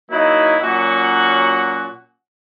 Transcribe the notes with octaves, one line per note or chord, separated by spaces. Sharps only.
F#3 A#3 D#4 E4
A#2 F#3 C#4 F#4 F#5